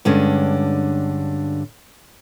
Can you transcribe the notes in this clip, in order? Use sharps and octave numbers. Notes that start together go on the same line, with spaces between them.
G2 D3 G#3 C#4